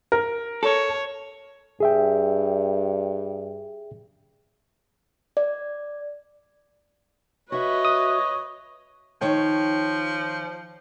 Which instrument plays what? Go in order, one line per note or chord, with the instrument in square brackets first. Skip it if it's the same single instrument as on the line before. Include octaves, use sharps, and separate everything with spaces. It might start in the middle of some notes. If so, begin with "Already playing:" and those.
[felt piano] A#4
[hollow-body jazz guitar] A4 [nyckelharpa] C#5
[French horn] G2 [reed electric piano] G#4 E5 G5
[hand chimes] D5
[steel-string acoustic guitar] F#4 E5 [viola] B4 D#5 [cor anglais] C#5
[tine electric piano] D#6
[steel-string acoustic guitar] D#3 C#5 G5 [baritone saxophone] F3